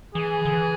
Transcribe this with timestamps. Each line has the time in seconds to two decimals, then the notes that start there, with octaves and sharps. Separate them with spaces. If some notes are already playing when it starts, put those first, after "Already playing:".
0.15 E3 G#4
0.45 D3
0.53 E3